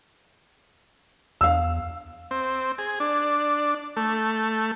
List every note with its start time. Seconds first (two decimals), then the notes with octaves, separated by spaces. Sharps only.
1.41 E2 F5 E6
2.31 C4
2.78 G#4
3.00 D4
3.97 A3